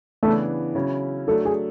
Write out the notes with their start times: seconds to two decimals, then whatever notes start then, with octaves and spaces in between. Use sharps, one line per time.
0.23 C#3 E3 A3 B3 D4
0.75 C#3 F#3 C#4 E4
1.28 F#3 A3 D4 A4
1.45 G#4